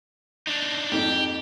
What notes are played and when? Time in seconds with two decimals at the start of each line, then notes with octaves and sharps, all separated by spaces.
0.47 D4 D#4
0.92 F2 G#2 G4